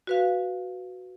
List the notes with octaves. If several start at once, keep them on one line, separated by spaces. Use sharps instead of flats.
F#4 B4 F5